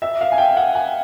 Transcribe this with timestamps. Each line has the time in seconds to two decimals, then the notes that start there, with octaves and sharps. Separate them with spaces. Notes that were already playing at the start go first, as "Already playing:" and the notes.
0.02 E5
0.21 F5
0.32 G#5
0.38 G5
0.57 F#5
0.75 G#5